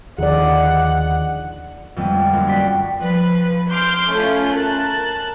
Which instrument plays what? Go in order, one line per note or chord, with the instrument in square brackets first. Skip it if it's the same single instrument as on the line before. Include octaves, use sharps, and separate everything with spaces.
[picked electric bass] D#2 [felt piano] D3 D#3 F3 [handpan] G#4 D5 [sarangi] F#5
[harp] F2 D3 G3 G#3 B3
F#2 A#3 F4 F#4
F#4 C5 D5 G5 F#6 B6
[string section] F3 B4
C6 D6 E6 F6 G6
A3 C#4 E4 F4
A#4 A5 F#6